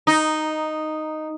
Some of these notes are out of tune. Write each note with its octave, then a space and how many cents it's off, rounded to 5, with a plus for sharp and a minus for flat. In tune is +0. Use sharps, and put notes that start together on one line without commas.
D#4 -5